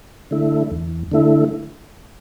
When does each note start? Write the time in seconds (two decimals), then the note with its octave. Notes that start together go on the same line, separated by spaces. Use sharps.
0.31 D3 A3 E4
0.71 E2
1.11 D3 A3 E4